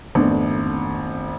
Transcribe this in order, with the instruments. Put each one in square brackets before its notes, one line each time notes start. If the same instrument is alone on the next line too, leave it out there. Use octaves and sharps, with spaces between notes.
[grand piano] G#1 F2 [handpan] A3 B3 D4